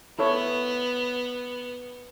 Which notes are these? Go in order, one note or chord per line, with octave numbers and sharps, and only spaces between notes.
B3 E4 A4 C#5